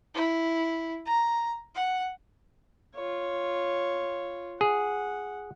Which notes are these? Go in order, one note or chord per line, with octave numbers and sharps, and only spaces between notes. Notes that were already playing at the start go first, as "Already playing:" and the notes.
E4
A#5
F#5
F4 C#5
G#4 F#5